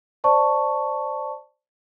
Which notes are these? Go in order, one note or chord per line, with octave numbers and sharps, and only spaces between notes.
C5 D5 A5 C#6